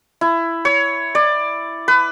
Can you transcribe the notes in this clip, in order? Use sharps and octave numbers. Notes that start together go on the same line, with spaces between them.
E4
C#5
D5
B4